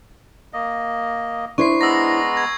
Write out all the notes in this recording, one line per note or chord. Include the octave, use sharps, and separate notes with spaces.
A#3 D#5
D4 E4 C5 C#6 C7
G#3 B3 A#5 E6 A#6
G#6